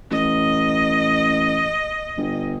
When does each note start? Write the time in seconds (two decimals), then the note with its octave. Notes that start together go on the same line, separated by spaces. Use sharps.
0.11 A1 D#5
2.18 G1